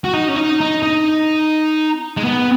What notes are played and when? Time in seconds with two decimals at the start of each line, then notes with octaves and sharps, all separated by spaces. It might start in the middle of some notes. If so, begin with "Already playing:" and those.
0.04 F#4
0.13 D#4
0.28 C#4
0.36 D#4
0.61 D#4
0.83 D#4
2.17 G#3
2.24 B3